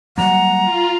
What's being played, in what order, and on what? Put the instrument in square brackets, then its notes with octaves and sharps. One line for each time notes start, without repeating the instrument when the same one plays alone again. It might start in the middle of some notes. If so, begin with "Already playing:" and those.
[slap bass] F#3 G3 A#3 [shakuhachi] F#5 [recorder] A#5
[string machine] F4